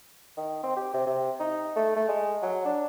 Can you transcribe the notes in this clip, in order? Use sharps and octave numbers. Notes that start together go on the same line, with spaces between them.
D#3
C4
G4
C3
C3
D#4
A3
A3
G#3
F#3
D4